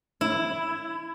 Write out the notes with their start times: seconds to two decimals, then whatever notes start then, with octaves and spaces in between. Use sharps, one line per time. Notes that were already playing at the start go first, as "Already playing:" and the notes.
0.21 E4